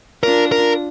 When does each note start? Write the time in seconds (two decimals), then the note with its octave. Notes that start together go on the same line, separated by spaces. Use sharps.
0.23 D4 F4 A#4
0.52 A#4